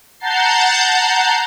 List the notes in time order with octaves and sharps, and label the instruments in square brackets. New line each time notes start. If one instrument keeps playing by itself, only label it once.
[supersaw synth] F#5 A5 A#5 G6 A6 C7